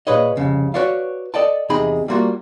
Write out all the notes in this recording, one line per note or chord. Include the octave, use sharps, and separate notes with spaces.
A#2 G#4 B4 C#5 D#5
C2 F2 C#3
F#4 B4 C#5 D5 F5
A4 D5 D#5 G5 A5
E2 C3 D#4 G#4 B5
G3 A3 A#3 F4 F#4